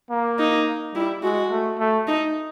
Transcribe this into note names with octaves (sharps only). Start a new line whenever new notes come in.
A#3
D#4
G3 E4
G#3 F#4
A3
A3
D#4